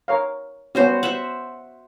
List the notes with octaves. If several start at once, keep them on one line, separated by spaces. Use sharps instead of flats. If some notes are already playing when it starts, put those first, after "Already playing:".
A#4 C#5 F5
G3 B3 C#4 F#4 C5
C5 E5 F#5